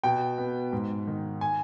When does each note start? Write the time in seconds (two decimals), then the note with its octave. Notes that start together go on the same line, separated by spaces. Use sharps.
0.04 B2 G5
0.38 B3
0.73 G#2
1.07 D#3
1.41 G#5